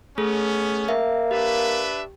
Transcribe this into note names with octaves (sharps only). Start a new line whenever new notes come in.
A3 B3 C#4 G#4 A4
A#3 E5
D4 G4 B4 E5